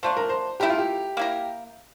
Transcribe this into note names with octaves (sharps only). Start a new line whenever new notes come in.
F3 A3 D4 C5
A#4
C5
A3 E4 G4 A#4
F4
G4
A#3 E4 A#4